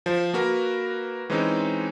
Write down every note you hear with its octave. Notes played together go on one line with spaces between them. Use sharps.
F3 C5
A#3 F#4 A#4 B4
E3 G#3 C4 C#4 D#4